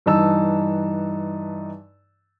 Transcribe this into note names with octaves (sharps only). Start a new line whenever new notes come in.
G2 E3 D#4 A5 E6